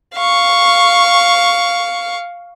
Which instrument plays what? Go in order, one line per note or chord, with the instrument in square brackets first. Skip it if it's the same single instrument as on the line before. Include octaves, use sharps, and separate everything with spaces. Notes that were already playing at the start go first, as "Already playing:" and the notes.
[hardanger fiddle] F5 C#6